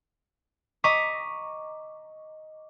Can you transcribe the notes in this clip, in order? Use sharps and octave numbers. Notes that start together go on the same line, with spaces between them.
D#5 A#5 C#6 D6 B6